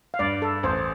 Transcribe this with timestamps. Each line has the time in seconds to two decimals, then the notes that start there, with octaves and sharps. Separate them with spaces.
0.14 F5
0.19 G2 D5
0.42 A4
0.63 A1 C5